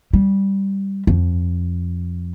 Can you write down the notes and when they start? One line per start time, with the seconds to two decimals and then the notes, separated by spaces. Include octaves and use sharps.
0.13 G3
1.07 F2